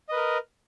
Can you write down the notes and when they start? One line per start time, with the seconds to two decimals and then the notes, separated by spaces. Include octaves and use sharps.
0.09 D#5
0.12 B4
0.16 A#4